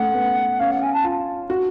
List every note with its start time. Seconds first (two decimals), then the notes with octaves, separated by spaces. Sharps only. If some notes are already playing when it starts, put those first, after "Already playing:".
Already playing: A3 C#4 F#5
0.15 B3
0.60 C#4 F5
0.71 F#5
0.82 G#5
0.93 A5
1.04 F4
1.50 F#4